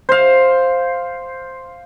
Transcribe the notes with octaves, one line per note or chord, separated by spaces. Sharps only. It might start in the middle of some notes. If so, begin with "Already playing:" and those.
C5 F5